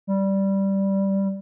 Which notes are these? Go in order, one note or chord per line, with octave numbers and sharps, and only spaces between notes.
G3